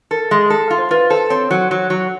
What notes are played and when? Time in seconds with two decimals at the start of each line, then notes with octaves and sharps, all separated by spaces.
0.11 A4 A#4
0.31 G#3
0.50 A4
0.70 F4
0.78 C5
0.91 F4 B4
1.10 A4 C5
1.30 C4 C#5
1.51 F#3
1.71 F#3
1.90 F#3